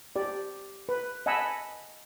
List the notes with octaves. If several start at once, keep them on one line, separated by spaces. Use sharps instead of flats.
G4 D5
B4
D#5 F#5 G#5 A5 B5 E6